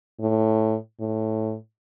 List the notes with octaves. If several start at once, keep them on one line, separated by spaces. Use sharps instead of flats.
A2
A2